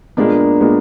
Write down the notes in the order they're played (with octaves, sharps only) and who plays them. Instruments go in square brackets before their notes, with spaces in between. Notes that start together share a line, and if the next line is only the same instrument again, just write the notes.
[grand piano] A#2 G#3 B3 [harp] A#3 D4
[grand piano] A#2 G#3 B3